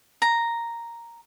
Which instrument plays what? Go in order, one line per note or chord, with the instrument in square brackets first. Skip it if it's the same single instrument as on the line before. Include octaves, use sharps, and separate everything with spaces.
[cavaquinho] A#5